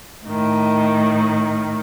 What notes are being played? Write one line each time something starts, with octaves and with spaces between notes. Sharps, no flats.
A2 D#3